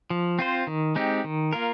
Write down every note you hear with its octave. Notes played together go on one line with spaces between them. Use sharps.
F3
C4 F4 C5
D#3
G#3 C4 D#4 G4
D#3
A#3 F4 A#4